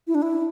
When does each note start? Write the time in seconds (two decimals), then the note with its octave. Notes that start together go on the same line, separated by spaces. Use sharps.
0.07 E4
0.15 D4
0.22 E4